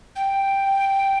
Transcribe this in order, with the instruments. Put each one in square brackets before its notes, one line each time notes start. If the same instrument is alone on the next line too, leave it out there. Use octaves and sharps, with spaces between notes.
[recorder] G5